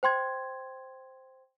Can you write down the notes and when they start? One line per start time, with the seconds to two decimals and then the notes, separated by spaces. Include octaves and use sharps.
0.03 C5 G5 C6 G#6